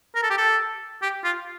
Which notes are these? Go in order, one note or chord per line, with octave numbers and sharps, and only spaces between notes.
A#4
A4
G4
A4
G4
F4